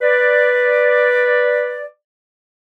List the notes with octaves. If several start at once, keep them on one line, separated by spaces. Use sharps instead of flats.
B4 D5